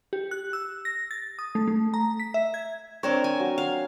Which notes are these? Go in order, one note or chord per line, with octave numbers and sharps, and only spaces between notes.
G4
F#6
E6
A#6
A6
D#6
A3
A3
A#5
B6
E5
G#6
C4 D4 A#4 C#5 G5
G#5
F#3
F5